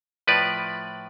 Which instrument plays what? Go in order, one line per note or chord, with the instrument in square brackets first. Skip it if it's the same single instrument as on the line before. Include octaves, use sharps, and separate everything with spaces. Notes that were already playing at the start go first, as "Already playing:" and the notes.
[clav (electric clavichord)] A2 F3 B4 D5